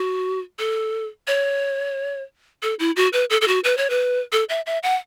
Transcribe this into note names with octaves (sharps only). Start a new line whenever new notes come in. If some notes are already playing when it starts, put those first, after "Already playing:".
Already playing: F#4
A4
C#5
A4
E4
F#4
B4
A4
A4
F#4
B4
C#5
B4
A4
E5
E5
F#5